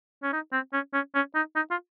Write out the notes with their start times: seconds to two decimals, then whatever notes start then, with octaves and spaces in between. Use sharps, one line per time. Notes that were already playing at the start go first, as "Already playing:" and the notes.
0.23 C#4
0.33 D#4
0.53 C4
0.73 C#4
0.94 C#4
1.15 C#4
1.35 D#4
1.56 D#4
1.71 F4